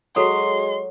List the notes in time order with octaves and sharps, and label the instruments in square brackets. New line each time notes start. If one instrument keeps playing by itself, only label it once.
[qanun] F#3 [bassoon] G#3 [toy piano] F#4 A4 [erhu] C6